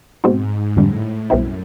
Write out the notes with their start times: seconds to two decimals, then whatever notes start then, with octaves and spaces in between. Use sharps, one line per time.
0.24 G#2 B2 G#3 C4 D#4 F#4
0.77 F2 A2 D3 G3
1.30 B1 F#2 B2 G3 C4 E4